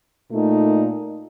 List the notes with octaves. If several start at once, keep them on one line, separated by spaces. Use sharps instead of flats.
A#2 A3 D#4